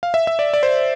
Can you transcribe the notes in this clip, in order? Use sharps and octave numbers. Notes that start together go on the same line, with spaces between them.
F5
E5
E5
D5
D5
C5